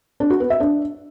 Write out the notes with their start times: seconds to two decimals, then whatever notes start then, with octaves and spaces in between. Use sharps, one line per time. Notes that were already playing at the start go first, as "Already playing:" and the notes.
0.20 D4
0.30 F#4
0.40 B3
0.50 E5
0.60 D4